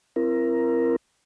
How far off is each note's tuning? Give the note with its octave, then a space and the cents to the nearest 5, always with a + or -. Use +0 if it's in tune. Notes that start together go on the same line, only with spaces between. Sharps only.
C4 +0 E4 +40 A#4 +10